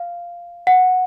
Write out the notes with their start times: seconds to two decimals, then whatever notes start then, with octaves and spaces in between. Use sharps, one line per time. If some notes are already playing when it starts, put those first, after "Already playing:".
Already playing: F5
0.67 F#5